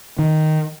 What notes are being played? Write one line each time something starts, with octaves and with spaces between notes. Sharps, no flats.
D#3